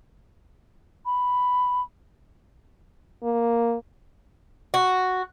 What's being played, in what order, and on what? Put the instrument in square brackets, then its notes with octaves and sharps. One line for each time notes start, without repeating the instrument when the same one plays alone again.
[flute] B5
[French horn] A#3
[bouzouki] F#4